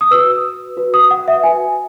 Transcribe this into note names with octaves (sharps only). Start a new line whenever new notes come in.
D#6
F#4 B4 E6
F#4 B4
D#6
F#5
E5
F#4 B4 G#5